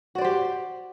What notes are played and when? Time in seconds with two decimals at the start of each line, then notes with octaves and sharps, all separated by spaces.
0.15 F#4
0.18 D5
0.21 C5
0.24 G4